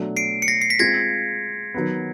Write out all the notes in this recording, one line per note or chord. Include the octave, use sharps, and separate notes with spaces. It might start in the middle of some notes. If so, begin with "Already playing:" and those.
Already playing: B2 F#3 A3 D4
C7 D7
C#7
A#6 C7
C7
B6
G#3 C4 F4 G#6 A#6
D#3 F#3 B3